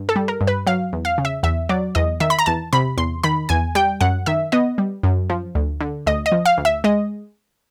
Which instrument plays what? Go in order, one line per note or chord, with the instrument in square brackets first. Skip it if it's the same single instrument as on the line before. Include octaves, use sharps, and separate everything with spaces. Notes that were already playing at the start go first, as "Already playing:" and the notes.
Already playing: [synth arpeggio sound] G2
A4
G3
A#4
G2
B4
F#3 F5
E2
F5
C#3
E5
E2 E5
F#3 D5
E2 D#5
D#3 E5
B5
A#5
E2 A5
C3 B5
E2 C6
D#3 B5
E2 G#5
G3 G5
F#2 F#5
D#3 E5
B3 D#5
G3
F#2
F3
D2
D3
D2 D#5
D#5
F3
F5
D2
E5
G#3 D#5